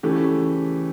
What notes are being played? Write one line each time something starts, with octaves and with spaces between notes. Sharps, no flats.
C#3 E3 A3 C#4 G4